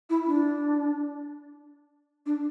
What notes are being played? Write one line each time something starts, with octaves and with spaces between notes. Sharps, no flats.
E4
D4
D4